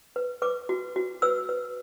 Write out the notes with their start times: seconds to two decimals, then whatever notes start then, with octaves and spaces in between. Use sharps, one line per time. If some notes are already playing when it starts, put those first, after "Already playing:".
0.16 B4
0.42 B4 D6
0.69 F#4
0.96 F#4
1.22 B4 E6
1.49 B4